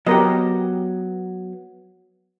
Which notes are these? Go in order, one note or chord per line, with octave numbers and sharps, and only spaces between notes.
F#3 B3 G4 A#4 D#5